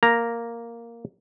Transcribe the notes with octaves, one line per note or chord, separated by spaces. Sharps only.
A#3 A#5